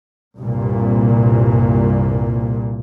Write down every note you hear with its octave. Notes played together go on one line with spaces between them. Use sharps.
C2 G2 A#2